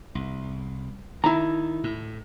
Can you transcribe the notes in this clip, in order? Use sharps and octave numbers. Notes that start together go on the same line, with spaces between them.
C2
D#3 E4 A#5
A2